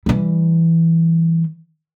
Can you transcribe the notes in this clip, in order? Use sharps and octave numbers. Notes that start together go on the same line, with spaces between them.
E3 G3